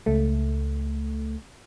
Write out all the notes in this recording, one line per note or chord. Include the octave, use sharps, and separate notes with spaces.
C#2 A3